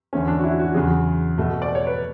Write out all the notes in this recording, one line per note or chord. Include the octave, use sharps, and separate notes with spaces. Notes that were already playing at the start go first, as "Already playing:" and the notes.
E2 D3 A3 C#4
D4
F#4
E4
F#4
E2 C#3 F#3 G#4
B2 A3
D5
C#5
B4